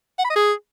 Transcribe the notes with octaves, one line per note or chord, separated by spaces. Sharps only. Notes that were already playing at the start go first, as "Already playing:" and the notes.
F#5
B5
D#5
G#4